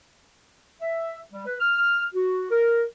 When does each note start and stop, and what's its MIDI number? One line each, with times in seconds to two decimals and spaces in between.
0.81 1.19 76
1.32 1.43 55
1.46 1.55 71
1.60 2.05 89
2.14 2.46 66
2.50 2.83 70